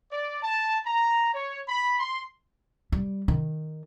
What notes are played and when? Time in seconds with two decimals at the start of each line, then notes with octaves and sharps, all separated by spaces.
0.12 D5
0.42 A5
0.85 A#5
1.33 C#5
1.67 B5
1.99 C6
2.92 G3
3.28 D#3